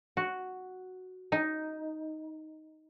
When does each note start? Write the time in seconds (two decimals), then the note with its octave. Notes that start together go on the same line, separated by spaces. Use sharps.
0.17 F#4
1.32 D#4